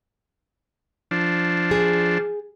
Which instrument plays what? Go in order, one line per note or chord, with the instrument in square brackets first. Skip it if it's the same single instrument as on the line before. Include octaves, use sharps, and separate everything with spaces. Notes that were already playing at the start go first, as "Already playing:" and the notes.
[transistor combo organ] F3 D4
[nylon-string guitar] G#4